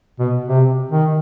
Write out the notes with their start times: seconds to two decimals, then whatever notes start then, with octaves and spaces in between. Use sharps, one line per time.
0.19 B2
0.48 C3
0.92 D#3